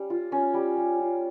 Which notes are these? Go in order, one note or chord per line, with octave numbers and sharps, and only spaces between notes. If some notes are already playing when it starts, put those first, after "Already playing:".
Already playing: G3 C#4
F4
C#4
G3
G3
F4